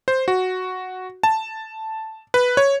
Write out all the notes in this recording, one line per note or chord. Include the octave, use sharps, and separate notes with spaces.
C5
F#4
A5
B4
C#5